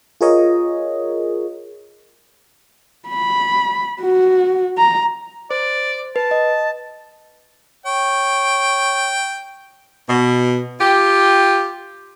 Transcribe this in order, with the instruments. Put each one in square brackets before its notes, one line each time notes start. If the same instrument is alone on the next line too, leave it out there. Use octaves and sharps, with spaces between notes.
[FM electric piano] F4 G#4 A#4 C#5 D#5
[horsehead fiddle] B5
F#4
A#5
[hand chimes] C5 [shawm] D5
[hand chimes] B4 [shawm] A5
[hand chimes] D#5
[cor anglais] C#5 [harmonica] G5
[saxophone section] B2
F4 G4